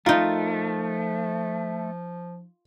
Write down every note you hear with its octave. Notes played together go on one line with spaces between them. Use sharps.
F3 A3 D#4 F4 A#4